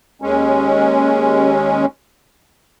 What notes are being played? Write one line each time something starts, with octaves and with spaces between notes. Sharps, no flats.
D#2 G#3 C#4